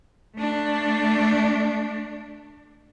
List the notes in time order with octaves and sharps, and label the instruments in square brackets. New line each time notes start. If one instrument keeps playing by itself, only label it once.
[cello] A3 D4